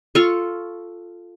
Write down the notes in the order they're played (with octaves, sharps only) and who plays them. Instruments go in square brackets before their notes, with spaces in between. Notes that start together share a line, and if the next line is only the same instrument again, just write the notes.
[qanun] F4 A4 F5 C#6